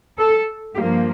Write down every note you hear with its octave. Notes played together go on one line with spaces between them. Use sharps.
A4
G2 F3 A#3 G4